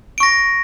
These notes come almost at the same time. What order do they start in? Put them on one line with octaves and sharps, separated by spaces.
D7 C#6 A#6